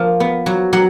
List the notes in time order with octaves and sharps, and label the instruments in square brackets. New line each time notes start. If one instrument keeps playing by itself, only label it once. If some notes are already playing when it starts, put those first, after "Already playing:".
Already playing: [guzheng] F3 A#3
B3
F#3
F#3 F#5